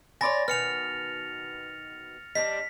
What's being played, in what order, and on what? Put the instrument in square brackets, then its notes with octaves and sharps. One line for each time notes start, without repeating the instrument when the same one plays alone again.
[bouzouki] C#5 D5 E5 [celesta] G#5 B5 C6 [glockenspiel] A6 A#6
[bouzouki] B2 D#3 [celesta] B4 G#5 [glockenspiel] F6 C#7 F7
[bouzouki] G3 C4 D4 [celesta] D#5 [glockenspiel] B6